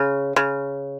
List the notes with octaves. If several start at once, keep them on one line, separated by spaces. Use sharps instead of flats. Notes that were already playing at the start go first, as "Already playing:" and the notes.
Already playing: C#3
C#3